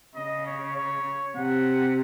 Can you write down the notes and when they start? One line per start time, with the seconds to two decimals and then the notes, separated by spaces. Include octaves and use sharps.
0.15 C#3 D#5
0.46 C#5
0.76 C#5
1.36 C3 F#5